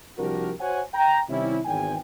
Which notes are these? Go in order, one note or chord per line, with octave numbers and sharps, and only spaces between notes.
C2 F3 D4 F#4 G4 A#4
F#4 C5 C#5 F#5 G#5
G5 A#5
C3 D#3 G3 C#4 E4
G#1 E2 G5 G#5